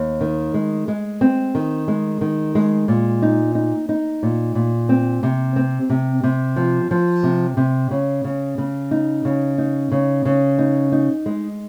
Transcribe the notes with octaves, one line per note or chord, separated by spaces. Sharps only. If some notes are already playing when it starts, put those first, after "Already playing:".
Already playing: D#2
D#3
G#3
G#3
C4
D#3
G#3
D#3
G#3
A#2
D#4
D#4
D#4
A#2
A#2
C4
C3
C4
C3
C3
F3
F3
C3
C3
C#3
C#3
C#3
D#4
C#3
D#4
C#3
C#3
D#4
D#4
G#3